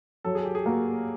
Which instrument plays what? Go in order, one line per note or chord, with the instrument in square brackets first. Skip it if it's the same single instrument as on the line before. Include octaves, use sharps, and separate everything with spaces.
[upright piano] F#3 [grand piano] A4
[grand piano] G#4
G4
G#4
[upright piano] A#3 [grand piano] F#4